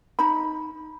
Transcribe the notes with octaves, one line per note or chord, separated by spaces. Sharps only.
D#4 B5